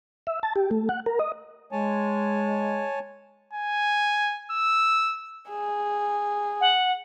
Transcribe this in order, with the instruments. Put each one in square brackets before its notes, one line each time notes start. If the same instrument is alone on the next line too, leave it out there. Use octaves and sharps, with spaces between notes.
[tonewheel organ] E5
A5
G4
A3
F#5
A#4
D#5
[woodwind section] G#3 [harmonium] C#5 G#5 A5
[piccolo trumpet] G#5
E6
[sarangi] G#4
[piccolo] F#5